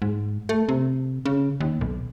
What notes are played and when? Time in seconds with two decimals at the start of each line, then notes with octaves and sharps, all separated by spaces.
0.02 G#2
0.49 A3
0.69 C3
1.26 C#3
1.60 D#2
1.81 B1